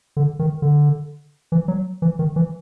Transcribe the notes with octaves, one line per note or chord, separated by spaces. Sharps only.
D3
D#3
D3
E3
F#3
E3
D#3
E3